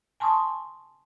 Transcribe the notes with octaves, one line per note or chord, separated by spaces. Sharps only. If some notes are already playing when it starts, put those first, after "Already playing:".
G#5 A5 C6 C#6 D#6